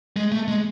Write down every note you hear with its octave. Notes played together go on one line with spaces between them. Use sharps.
G#3
A3
G#3